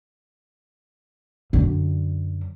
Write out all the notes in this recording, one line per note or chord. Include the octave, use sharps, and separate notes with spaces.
F#2 D3